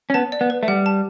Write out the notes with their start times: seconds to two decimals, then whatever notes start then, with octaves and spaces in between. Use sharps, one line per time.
0.10 C#4
0.14 B3 A5
0.32 D5
0.41 B3
0.50 B4
0.63 A3
0.68 G3 F#5
0.86 A5